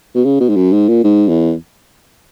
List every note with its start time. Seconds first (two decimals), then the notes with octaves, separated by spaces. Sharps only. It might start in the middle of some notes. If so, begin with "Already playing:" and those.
0.15 B2
0.25 C#3
0.40 B2
0.49 G#2
0.56 F#2
0.72 G#2
0.88 A#2
1.04 G#2
1.28 E2